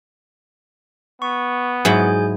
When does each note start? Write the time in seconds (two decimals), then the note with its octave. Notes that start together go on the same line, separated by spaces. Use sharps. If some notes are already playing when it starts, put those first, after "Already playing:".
1.22 B3 C#6
1.85 G#2 F#3 E4 G#4 G#5 G6